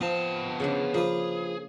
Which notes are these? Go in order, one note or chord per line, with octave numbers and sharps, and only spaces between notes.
F3 B3 C4 A5
C#3 F3 D4
F3 A#3 G#4 B4